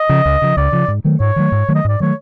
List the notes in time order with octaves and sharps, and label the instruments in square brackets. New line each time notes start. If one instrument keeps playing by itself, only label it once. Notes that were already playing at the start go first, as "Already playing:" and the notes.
Already playing: [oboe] D#5
[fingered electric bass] C#3 F3
C#2
C#3 F3
[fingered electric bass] C#2 [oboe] D5
[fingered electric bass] C#3 F3
G#2
D#3 F#3 A3
[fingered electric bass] G#2 [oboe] C#5
[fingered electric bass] D#3 F#3 A3
G#2
D#3 F#3 A3
[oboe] D#5
[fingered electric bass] G#2 [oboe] D5
[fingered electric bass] D#3 F#3 A3 [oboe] C#5